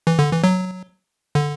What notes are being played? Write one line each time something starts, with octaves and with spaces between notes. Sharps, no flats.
E3
D3
E3
F#3
D3